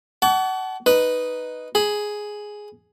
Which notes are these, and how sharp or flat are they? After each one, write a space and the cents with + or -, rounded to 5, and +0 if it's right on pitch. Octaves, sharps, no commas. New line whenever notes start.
F#5 +25 A5 -30 C#6 +45
D#4 +0 B4 +0
G#4 +5 B5 +0